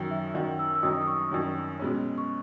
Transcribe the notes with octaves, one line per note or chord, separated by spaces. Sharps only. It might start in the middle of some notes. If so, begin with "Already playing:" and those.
Already playing: F#2 D#3 F#3
E5
F#2 D#3 F#3 F#5
E6
E6
F#2 D#3 F#3 D#6
D#6
C#6
F#2 D#3 F#3
B2 G#3 C#4
C#6